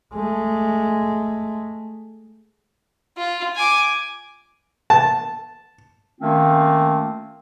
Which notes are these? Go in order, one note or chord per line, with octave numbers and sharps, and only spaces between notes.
G#3 A3
F4
G#5 D6
A5
D#3 A3 A#3 C4 C#4 F4